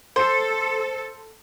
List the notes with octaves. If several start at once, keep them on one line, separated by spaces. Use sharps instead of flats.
A4 C5